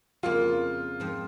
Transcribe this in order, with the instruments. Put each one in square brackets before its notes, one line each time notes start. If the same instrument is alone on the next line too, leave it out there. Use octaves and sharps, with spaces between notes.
[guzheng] F2 C#3 F3 A#3 [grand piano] F4
[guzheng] G#2 F3 C4